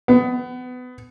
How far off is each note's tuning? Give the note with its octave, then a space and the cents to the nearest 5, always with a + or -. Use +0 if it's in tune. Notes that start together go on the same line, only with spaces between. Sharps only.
B3 +25